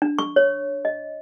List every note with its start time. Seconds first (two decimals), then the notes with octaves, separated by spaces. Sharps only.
0.02 D4
0.19 C#6
0.36 C#5
0.85 D#5